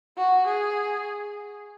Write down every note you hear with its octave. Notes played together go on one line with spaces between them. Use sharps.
F#4
G#4